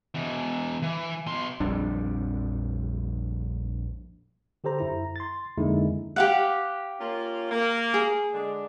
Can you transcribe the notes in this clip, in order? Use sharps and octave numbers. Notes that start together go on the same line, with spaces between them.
B2 E3
E3
B2 C6
A#1 F2 G3 D4
D3 G4 A4 C5 A#5
F#2 E4 A#5
C6 A6
F2 D3 G#3 A#3 D#4 E4
G4 F5 F#5
A#3 C#4 F4
A#3
G#4
D3 G#3 D4